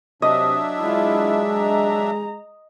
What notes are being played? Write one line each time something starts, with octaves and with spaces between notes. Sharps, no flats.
C3 F#3 D4 D#5 E5
G#3 E4 F4
A#5